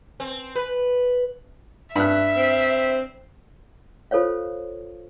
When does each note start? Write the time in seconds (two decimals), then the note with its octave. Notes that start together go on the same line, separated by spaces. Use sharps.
0.20 C4
0.56 B4
1.96 G2 E5 F#6
2.36 C4
4.11 F4 A4 C5 C#5 F5